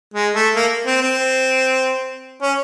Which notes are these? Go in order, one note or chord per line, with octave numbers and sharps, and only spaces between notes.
G#3
A3
A#3
C4
C4
C#4